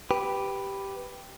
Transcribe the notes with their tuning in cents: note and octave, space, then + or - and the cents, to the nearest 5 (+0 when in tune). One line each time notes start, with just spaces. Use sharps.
G4 +0 B4 +0